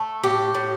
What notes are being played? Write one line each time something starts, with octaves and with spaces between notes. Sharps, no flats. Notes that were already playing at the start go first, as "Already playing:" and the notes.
Already playing: A3
A2 G4
A2